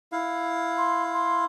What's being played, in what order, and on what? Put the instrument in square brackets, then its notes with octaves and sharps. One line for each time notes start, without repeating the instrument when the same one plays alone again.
[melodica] E4 F5
[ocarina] C6
C6